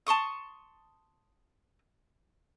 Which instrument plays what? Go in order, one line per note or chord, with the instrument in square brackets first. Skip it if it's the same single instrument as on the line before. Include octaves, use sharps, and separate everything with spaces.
[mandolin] A5 C6 C#6 D#6